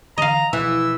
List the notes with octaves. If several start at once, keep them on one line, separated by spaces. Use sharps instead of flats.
D3 E3 D#5 F5 A#5
B2 E3 F3 E6